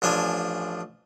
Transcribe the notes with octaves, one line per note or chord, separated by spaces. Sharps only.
A1 F3 D4 G#5